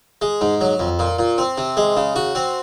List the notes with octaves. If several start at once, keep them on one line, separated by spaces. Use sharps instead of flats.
G#3
G#2
F#3
F2
A#2
A#2
C4
C3
G#3
C#3
F#4
C4